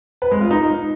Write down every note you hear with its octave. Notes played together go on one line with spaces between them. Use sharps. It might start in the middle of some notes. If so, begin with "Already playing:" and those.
B4
G#3
F4
D#4